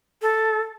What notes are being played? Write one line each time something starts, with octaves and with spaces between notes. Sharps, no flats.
A4